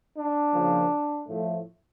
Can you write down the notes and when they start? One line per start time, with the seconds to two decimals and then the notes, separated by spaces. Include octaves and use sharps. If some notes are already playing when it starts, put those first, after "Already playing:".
0.17 D4
0.54 C#3 F3 A#3
1.28 A2 F3 A3